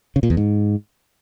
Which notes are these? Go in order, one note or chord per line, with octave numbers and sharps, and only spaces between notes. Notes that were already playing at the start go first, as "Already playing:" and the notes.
C#3
A#2
E2
G#2